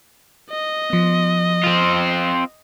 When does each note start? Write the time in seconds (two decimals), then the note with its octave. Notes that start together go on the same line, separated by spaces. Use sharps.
0.50 D#5
0.90 F3 B3
1.64 C4 F4